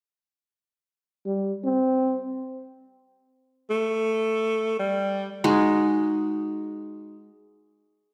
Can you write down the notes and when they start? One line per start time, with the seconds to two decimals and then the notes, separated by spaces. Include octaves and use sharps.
1.26 G3
1.64 C4
3.70 A3
4.79 G3
5.44 G#3 D#4 F#4